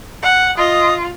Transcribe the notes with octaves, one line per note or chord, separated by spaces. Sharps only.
F#5
F4 D#5 D#6